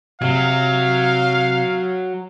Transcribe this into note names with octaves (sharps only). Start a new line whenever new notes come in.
C3 F#3 F5